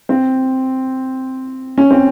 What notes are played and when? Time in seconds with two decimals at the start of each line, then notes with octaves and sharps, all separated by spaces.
0.09 C4
1.78 C#4
1.91 C4